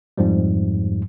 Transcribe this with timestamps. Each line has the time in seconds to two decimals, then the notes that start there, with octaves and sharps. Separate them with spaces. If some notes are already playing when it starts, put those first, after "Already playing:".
0.18 F2 G#2 F3 G3